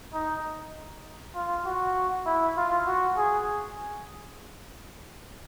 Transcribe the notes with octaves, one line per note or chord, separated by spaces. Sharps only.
D#4
F4
F#4
E4
F4
F#4
G#4